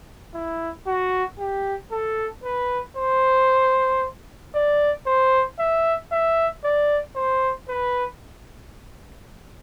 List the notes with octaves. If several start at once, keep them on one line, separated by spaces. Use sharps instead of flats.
E4
F#4
G4
A4
B4
C5
D5
C5
E5
E5
D5
C5
B4